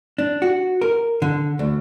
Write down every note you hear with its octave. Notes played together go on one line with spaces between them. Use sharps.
D4
F#4
A#4
D3
D2